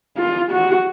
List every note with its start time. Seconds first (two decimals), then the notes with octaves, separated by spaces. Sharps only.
0.18 F4
0.51 F#4